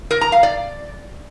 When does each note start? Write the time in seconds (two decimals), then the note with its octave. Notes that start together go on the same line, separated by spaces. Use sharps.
0.11 A#4
0.21 A#5
0.32 F5
0.43 D5